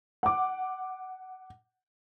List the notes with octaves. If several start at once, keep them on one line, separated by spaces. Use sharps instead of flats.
F#5 D6